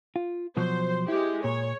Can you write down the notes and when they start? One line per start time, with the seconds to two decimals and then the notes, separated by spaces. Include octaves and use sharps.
0.16 F4
0.57 B2 F3 F#3 C5
1.08 G#3 E4 G4
1.44 A#2 C#5